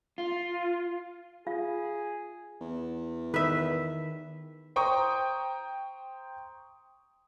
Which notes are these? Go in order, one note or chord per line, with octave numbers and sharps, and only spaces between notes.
F4
F4 G#4 F5
E2
D#3 B4 E5
C5 G5 A#5 C#6 D#6